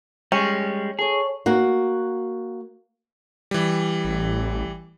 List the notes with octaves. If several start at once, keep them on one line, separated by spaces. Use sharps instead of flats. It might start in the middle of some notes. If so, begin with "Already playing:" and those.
G3 G#3 C#4
G#4 A4 C#5
A#3 F#4
E3 G3
A1